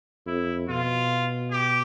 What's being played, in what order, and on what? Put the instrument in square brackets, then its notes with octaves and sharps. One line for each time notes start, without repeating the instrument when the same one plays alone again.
[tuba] F2 [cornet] E4
[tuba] B2 [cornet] F4
[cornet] G4